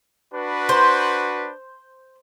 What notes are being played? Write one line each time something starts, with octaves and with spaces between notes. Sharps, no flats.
D4 F#4 B4
C5